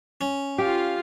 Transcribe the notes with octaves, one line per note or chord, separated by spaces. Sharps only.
C#4
F4 G4 F5